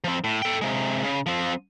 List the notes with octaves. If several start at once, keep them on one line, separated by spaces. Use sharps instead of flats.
F3 C4
A2
A4 G5
C3 G#3
C#3
F3 C4